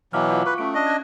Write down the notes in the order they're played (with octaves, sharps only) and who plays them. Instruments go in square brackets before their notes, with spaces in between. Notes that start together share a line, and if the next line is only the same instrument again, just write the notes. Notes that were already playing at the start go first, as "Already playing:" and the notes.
[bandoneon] B2 E3 F#3 [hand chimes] F5 D6 F6
[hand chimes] F4 F5
[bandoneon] B4 [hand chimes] C#6
[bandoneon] A3 [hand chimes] C#4 D7
[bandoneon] D4 D#5 [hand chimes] A#6
[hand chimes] D5 F#6 G#6